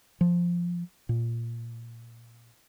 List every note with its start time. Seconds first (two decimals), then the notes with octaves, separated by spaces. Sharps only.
0.21 F3
1.09 A#2